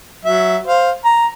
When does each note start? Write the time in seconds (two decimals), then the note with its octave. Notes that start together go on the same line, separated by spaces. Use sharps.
0.25 F#3 E5
0.67 C5 F5
1.05 A#5